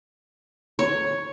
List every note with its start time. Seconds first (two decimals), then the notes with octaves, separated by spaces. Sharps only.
0.79 C#5